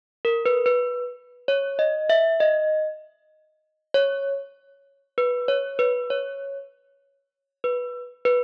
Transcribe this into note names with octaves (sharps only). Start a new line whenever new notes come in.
A#4
B4
B4
C#5
D#5
E5
D#5
C#5
B4
C#5
B4
C#5
B4
B4